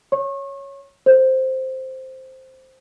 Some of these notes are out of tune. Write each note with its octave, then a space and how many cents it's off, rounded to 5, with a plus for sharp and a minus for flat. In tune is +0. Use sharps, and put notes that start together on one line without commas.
C#5 +0 C#6 -35
A4 +0 C5 +0